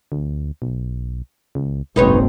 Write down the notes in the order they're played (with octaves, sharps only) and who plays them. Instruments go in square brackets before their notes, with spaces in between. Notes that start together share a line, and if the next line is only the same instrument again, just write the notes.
[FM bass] D2
B1
C#2
[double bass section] F#1 B1 C4 [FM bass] G#2 [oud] D#4 B4 C#5